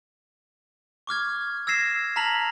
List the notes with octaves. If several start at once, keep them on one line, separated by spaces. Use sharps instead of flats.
C#6 D6 F6 G#6
E6 G#6 A#6 C7 E7
A5 A#5 F6 B6 F7 F#7